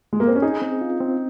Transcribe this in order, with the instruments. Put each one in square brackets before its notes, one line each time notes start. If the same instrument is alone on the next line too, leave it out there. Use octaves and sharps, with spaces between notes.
[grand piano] G#3
A#3
C4
C#4
[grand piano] D#4 [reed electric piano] G#4
[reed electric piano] C4
F4
C4